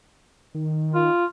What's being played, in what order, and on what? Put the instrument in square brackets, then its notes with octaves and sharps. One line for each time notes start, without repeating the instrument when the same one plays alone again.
[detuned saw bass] D#3
[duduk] F4